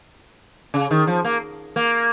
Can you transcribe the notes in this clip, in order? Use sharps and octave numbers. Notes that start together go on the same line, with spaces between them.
C#3
D#3
F3
A#3
A#3